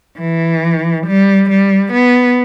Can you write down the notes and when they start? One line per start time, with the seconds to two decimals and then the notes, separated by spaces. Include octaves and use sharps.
0.19 E3
1.07 G3
1.50 G3
1.93 B3